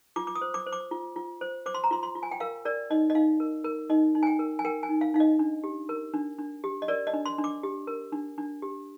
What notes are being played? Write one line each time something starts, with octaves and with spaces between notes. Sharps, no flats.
F4 D6
D6
D#6
C5
D6
C5
D6
F4
F4
C5
C5 D6
C6
A#5
F4 C6
C6
F4
G#5
G5
A#4 F5
A#4 D5
D#4 D#5
D#5
D#4 F5
A#4
A#4
D#4 D#5
D#4
G#5
G5
A#4
G#5
A#4 G5
G#5
D#4
F5
D#4 F5
D#5
D4
G4
A#4
D4
D4
G4
D#5
A#4 D5
D#5
D4
C6
D4
D6
G4
A#4
D4
D4
G4